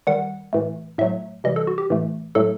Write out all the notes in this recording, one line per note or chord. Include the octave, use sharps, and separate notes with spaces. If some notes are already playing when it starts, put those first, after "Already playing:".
D#3 G3 F#5
A2 E3 A3
A2 F#3 A3 E5
C3 E3 G3 D#5
A4
F#4
G4
A2 E3 A3
A2 F#3 A3 A4